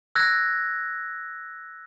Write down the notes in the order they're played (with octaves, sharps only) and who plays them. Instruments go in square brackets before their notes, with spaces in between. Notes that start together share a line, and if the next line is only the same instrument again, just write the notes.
[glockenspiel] E6 F#6 G#6 A#6